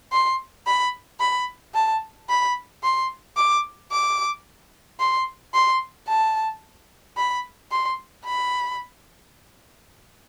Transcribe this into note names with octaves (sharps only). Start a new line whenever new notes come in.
C6
B5
B5
A5
B5
C6
D6
D6
C6
C6
A5
B5
C6
B5